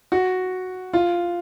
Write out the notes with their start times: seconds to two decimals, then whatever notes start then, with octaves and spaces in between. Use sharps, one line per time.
0.12 F#4
0.93 F4